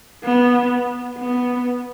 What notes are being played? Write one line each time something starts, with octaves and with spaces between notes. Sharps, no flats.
B3
B3